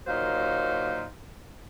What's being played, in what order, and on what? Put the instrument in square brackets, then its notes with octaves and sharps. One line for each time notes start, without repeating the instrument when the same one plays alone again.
[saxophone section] D#2 A#2 F#3 D#4 C5 F5